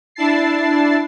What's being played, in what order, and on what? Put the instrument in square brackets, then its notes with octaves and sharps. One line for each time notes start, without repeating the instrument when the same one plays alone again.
[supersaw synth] D4 E4 A5 A6 C7